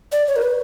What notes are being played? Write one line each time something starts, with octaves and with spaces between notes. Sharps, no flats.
D5
C#5
A#4
B4